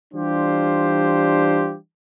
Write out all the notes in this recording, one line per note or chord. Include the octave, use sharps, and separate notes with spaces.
E3 G3 D4 F4 G4 C5